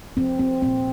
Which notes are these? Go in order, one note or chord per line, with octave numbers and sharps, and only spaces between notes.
F3 C4
C4
A#2 C4